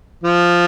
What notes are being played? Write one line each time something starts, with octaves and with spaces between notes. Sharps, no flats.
F3